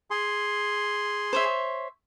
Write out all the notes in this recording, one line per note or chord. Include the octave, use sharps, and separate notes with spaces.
G#4 C6
C5 C#5 E5